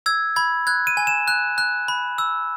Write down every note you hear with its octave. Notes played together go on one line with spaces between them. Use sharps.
E6 G#6
B5 G#6
F#6 G#6
D#7
G#5
E7
F#6
F#6
B5
E6